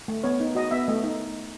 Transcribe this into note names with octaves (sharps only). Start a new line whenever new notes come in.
A3
B3 C#5
D#4
F#4 D#5
B3 E5
A3 D#5
D#4